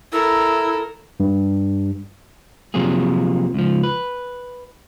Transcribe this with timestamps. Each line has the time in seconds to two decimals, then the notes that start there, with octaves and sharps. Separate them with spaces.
0.12 E4 A4 A#4 E6
1.20 G2
2.74 C3 F3 F#3 A#3 G#4
3.54 C#2 F3
3.83 B4